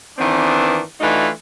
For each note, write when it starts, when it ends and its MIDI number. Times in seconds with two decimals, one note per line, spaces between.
0.18 0.80 51
0.18 0.80 52
0.18 0.80 59
0.18 0.80 60
0.18 0.80 62
1.00 1.28 52
1.00 1.28 57
1.00 1.28 62
1.00 1.28 63
1.00 1.28 65
1.00 1.28 66